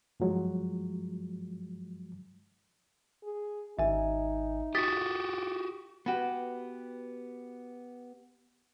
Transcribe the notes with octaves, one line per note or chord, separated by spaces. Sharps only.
G2 F3 F#3 G#3
G#4
G#1 D#4 E5 G#5
F#4 G4 D#6 A6 B6
B3 F#4 G4 B4